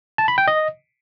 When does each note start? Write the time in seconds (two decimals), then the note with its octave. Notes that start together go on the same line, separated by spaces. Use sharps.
0.18 A5
0.28 B5
0.38 G5
0.48 D#5